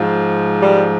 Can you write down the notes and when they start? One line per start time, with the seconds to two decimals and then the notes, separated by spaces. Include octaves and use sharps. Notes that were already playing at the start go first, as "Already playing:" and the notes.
Already playing: G#2 F3
0.61 G3